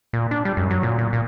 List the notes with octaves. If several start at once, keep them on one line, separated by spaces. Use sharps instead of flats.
A#2
D4
G3
F#2
F#3
A#2
A#2
A#2